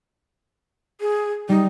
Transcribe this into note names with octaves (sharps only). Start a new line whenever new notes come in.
G#4
G3 D#4